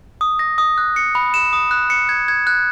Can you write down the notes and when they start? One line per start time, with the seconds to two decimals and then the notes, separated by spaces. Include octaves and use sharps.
0.21 D#6
0.39 A#6
0.58 D#6
0.78 F#6
0.96 C#7
1.15 B5
1.34 E7
1.53 D#6
1.71 F#6
1.90 C#7
2.09 G#6
2.28 G#6
2.47 F#6